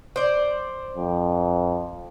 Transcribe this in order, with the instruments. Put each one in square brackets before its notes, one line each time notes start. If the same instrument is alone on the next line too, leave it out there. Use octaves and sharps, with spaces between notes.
[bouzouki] C5 D5
[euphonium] F2